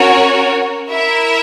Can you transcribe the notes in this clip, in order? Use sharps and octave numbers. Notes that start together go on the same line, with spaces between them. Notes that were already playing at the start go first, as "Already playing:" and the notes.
Already playing: C#4 F#4 A#4 C#5
E4 A#4 E5